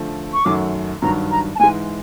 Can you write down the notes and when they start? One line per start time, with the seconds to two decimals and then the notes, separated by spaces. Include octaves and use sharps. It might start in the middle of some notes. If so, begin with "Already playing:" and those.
Already playing: D3 F3 A3
0.33 C#6
0.44 F#2 D#3 F#3 A3 D6
1.02 G2 D#3 F#3 A#5
1.31 A#5
1.55 A5
1.59 G#2 E3 G#3 G#5